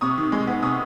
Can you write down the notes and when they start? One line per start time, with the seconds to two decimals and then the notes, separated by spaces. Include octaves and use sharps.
0.01 C3 C#6 D#6
0.18 D#3
0.32 G#3
0.47 B3
0.62 C3 C#6 D#6